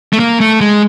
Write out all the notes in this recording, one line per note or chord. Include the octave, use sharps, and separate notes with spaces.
A3
A#3
A3
G#3